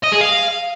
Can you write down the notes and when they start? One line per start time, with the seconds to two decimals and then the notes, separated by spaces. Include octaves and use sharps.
0.04 D#5
0.12 G#4
0.21 F5